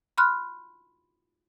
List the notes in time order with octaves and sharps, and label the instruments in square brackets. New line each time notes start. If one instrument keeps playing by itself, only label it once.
[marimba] B5 C6 F6 F#6